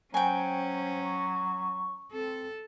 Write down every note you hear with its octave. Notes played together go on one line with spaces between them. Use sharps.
F#3 C#4 C5 G5 G#5
C#6
C4 A4